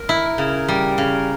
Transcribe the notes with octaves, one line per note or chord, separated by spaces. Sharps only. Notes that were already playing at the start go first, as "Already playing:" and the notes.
Already playing: A#4
E4
C#3
G3
C#3